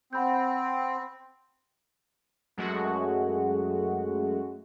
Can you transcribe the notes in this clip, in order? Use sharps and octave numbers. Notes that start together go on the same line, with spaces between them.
C4 F#5 B5 G6
F#2 G#3 A3 F#4